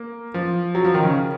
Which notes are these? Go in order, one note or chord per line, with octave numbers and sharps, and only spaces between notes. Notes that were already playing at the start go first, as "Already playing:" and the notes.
Already playing: A#3
F3
F#3
F3
D#3
C#3